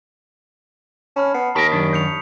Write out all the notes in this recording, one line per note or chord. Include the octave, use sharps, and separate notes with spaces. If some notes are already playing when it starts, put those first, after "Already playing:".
C#4 A5 B5 F6
B3 C7
D#2 A#4 G5 A5 C#6 D#6 B6
F#2 D#3 D4
G6 C#7 F7